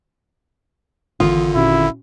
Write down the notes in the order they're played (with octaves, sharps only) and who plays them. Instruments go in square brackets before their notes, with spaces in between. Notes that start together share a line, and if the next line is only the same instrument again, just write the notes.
[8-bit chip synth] G#1 D3 [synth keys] E3 D#6 [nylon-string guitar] F4
[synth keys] A#2 C#4 F#4 [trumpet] E4